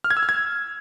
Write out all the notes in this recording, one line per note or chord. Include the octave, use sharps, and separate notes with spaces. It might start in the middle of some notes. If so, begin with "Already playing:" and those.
F6
G#6
E6
F6
G#6